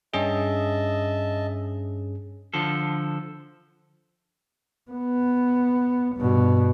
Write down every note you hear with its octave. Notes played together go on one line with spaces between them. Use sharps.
G2 C#4 G#4 D#5 E5 A5
D3 F3 A4
B3
G2 B2